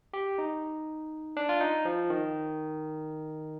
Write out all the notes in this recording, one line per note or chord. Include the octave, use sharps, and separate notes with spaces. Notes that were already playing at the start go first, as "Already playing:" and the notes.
G4
D#4
D4
F4
D#4
F3
D#3